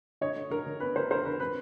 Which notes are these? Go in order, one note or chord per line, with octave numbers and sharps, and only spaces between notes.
D3 C#5 D#5
D3
D3 A#4
D3
B3 B4
D3 A#4 C5
D3 A#4 C5
D3 B4
C4 B4